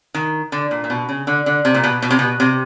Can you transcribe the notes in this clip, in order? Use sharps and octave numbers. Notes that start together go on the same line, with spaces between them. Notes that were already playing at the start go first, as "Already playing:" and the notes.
D#3
D3
A#2
A#2
B2
C#3
D3
D3
C3
A#2
B2
B2
C3
B2
C3